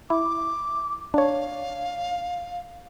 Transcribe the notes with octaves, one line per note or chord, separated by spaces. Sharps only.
E4 D6
D4 C#5 F5